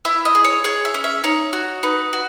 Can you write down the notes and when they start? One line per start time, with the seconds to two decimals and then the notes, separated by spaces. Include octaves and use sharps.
0.05 E4 E5
0.25 D#5
0.35 G#4
0.44 C#5
0.64 G#4 C#5
0.85 E5
0.94 C#4
1.04 E5
1.24 D#4 C#5
1.53 F#4
1.83 D#4 B4
2.13 F#4